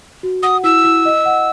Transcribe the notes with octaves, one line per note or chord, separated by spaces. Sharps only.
F#4
F#5 D#6
E4 E6
E4
D#5
F#5